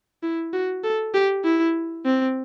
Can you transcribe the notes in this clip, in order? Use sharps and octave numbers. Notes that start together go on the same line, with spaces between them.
E4
F#4
A4
G4
E4
C4